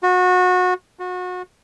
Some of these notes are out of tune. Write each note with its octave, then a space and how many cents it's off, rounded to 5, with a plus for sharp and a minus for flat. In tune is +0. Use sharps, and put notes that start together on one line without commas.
F#4 -25
F#4 -30